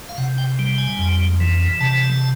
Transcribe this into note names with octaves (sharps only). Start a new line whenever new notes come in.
F5
C3 F#5
G5
G3
G#5
F2
E3
C3 A5